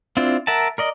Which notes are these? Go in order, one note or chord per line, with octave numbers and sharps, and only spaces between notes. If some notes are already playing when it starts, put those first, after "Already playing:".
C4 D4 E4 F4
A#4 E5 F#5 A5
A#4 D5 D#5